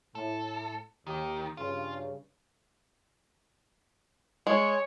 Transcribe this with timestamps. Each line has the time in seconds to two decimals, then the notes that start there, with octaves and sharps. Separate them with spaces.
0.15 A2 A4
1.07 D#2 D#3 G4
1.57 G2 C#3 F4
4.47 G#3 C#5